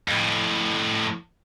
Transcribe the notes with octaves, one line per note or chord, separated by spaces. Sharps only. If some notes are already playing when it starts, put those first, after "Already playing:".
F2 A2